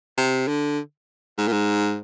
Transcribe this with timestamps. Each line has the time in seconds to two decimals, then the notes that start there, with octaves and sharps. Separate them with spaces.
0.17 C3
0.48 D3
1.38 G#2
1.48 A#2
1.52 G#2